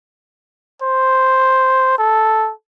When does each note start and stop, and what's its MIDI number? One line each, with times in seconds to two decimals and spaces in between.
0.82 1.94 72
1.98 2.51 69